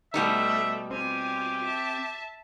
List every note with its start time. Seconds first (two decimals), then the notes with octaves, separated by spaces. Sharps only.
0.14 B2 G3 A3 D#4 E5
0.91 C4 F4 G4 G#5
1.64 E5 A5